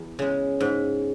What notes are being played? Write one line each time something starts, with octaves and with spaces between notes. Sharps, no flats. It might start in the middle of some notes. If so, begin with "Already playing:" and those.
Already playing: E2
C#3 G#3
G#2